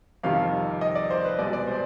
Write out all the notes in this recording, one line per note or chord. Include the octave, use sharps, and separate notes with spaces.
F2 C3 D#3 G3 F5
D#5
D5
C5
B4
C2 B2 G#3 B3 D5
D5
C5